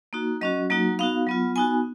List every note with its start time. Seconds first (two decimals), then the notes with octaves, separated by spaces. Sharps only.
0.13 A#3 D#4 F#4
0.41 F#3 C#4 F#4 D#5
0.70 F#3 A#3 D#4 F#4
0.99 B3 D#4 F#4 F5
1.27 F#3 B3 F4
1.56 B3 D#4 F#4 G#5